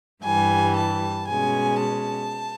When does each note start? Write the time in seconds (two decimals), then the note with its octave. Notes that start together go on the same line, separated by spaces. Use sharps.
0.24 G2 E3 G3 G#5
0.76 A5
1.28 B2 G#3 C#4 G#5
1.81 A5